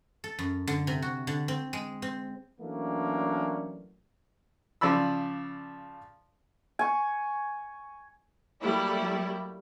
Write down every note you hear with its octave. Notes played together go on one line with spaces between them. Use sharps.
A4
F#2
D3
C3
F#4
D3
C4
G#3
C4
E3 F#3 A3 A#3 C#4 D4
C#3 F3 D5 B5 E6
G#5 C#6
F#3 G3 A3 A#3 E4